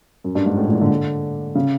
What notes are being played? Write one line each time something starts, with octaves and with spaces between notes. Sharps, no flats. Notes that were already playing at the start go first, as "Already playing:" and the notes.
F#2
G2
G#2
A2
A#2
G#2
D3
C#3